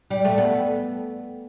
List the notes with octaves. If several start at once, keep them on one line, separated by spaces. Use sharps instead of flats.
G3
A3
B3